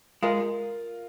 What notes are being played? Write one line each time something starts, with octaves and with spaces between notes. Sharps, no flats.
G#3 F4 A#4